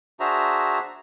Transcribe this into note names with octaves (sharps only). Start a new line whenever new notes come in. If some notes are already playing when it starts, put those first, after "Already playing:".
D4 F#4 G#4 C5 E5 A#5